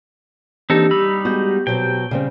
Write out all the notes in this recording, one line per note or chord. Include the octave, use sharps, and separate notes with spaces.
E3 A#3 C4 D4 D#4 G4 A4
G3 D#4 B5 E6
G#3 B3 F#4 G6
B2 F#3 C4 G5
C#3 G3 C4